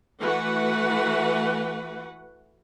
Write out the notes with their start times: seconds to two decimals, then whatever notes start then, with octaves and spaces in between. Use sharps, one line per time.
0.22 E3 A3 F#4 B4 F#5